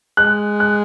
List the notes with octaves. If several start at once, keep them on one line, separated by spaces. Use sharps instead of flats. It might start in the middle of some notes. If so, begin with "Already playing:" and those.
G#3 F#6
F#6